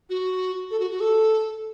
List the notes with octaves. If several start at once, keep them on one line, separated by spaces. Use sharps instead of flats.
F#4
A4
F#4
F#4
A4